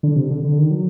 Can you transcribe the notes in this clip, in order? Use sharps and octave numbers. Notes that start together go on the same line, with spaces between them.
D3
C3
D3
D3
D#3
F#3